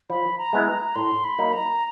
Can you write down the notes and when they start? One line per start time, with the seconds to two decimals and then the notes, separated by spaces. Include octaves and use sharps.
0.10 F3 B5
0.38 A#5
0.53 G#3 B3 E4
0.67 A#5
0.95 A2 C6
1.24 B5
1.38 F#3 A#3 D#4
1.53 A#5